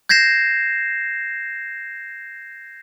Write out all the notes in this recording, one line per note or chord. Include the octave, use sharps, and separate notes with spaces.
G6 G#6 A#6 C7 E7